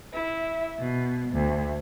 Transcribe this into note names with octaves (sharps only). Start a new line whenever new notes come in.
E4
B2
D2